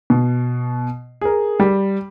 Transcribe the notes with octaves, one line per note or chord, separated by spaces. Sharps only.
B2
G#4 A#4
G3